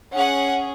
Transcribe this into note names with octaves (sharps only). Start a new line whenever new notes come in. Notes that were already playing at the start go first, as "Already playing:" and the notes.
C#4 G#4 F#5